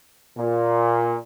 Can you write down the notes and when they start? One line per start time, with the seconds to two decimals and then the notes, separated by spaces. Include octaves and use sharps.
0.37 A#2